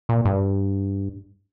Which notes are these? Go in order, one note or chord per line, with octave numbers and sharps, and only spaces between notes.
A#2
G2